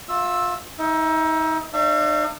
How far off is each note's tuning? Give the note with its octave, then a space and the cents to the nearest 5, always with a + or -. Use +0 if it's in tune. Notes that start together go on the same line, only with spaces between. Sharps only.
F4 +30 E5 +0 E6 -5
D#4 +30 E5 +0
D#4 -45 C#5 +0 E5 +45